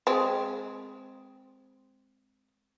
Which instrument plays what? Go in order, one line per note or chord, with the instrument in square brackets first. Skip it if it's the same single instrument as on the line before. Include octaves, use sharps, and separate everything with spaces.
[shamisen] G#3 C4